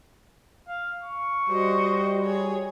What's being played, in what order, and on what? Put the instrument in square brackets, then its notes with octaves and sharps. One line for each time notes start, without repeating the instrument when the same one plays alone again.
[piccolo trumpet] F5
C#6
[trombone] G3 [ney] F#4 [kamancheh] C5 D#5
[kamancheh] G#4 C#5